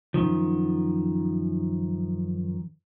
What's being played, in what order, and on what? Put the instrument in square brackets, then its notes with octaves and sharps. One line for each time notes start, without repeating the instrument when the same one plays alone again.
[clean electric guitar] F#2 A#2 D#3 F3